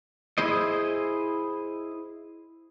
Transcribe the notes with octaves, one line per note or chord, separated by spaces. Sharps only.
E4 G#4 C5 D#5